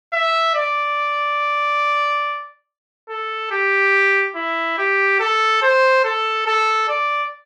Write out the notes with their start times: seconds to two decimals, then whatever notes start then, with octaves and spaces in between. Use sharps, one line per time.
0.13 E5
0.55 D5
3.09 A4
3.51 G4
4.35 E4
4.78 G4
5.20 A4
5.62 C5
6.04 A4
6.46 A4
6.89 D5